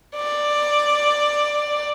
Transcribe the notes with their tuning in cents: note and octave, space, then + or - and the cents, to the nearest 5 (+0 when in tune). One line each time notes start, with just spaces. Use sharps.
D5 +10